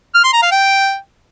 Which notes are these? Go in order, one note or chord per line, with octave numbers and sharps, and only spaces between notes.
F6
C6
A#5
F5
G5